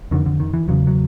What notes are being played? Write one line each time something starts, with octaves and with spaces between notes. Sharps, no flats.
F2 D3 D#3
D3
D#3
E3
E2 C#3 F#3
F#3